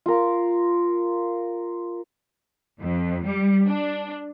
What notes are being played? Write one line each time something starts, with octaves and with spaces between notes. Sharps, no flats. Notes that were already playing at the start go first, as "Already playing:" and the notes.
F4 A#4
F2
G3
D4